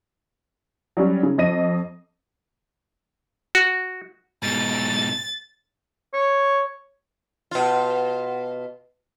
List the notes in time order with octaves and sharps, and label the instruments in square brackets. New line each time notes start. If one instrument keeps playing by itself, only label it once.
[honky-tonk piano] F#3 G3 C#4
C#3
F2 D#5 A#6 D#7
[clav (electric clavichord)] F#4
[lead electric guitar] G#2 B2 [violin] A6
[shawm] C#5
[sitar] B2 F4